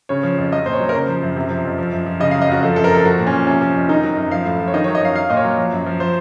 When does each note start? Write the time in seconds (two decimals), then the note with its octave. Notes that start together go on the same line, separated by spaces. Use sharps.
0.09 C#3 C#5
0.23 F3
0.38 F2
0.52 F#3 D#5
0.66 A#2 C5
0.73 C#5
0.80 F#3
0.89 A#4
0.94 C#3 C5
1.08 F3
1.23 F#2
1.36 C3
1.50 F3
1.64 F2
1.78 F3
1.92 F#2
2.06 F3
2.20 C#3 D#5
2.31 F#3 F5
2.42 D#5
2.48 F2 F#4
2.63 F3 A4
2.76 F#2 A4
2.84 A#4
2.91 F3 A4
3.05 F3 F#4
3.19 A#2
3.26 C#4
3.33 F3
3.47 C3 C#4
3.61 F3
3.75 F2
3.89 D#3 D#4
4.03 F#3
4.17 F#2
4.31 F3 F5
4.45 A2
4.60 F3
4.68 C#5
4.74 D#3 D#5
4.84 F#3 C#5
4.95 D#5
5.02 F#2 F5
5.15 F#3 F5
5.30 A#2 D#5
5.37 C#5
5.44 F#3
5.58 F3
5.72 F#2
5.86 F3
6.00 F3 C5